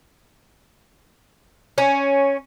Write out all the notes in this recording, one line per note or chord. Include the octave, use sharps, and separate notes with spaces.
C#4